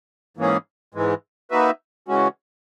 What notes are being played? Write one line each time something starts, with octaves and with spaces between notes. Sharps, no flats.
G#2 E3 A#3 C#4 G#4
G#2 E3 G#3
A#3 D#4 F#4 B4 E5
C#3 E3 G#3 C#4 F#4